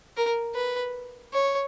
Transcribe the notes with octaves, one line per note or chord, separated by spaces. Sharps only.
A#4
B4
C#5